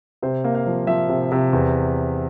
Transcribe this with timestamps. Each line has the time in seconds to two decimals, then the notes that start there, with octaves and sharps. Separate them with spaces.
0.22 C3 C5
0.44 A#3
0.55 F5
0.66 F3
0.87 F3 E5
1.09 C3
1.32 C3
1.53 E2